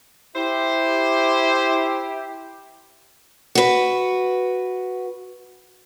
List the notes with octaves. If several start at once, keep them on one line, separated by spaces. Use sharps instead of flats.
E4 G4 C5
F#4 B4